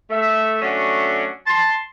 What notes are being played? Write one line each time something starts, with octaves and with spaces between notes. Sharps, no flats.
A3 E5
F#3 A3 C#4 D4 F#4
A5 C6